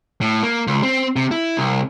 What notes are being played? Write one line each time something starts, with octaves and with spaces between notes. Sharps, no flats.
A2
A#3
C#2
C4
C3
E4
C2